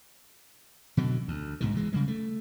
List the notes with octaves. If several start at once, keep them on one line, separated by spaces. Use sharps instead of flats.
B2 D3 F#3
D2
C2 G#2 B2 D#3
E3 G#3
C#3 G3 G#3
A3